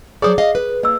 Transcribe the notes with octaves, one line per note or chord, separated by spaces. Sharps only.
F#3 G#4 C5 D5 D#6
D#5 F5
B4
A#3 D#5 E6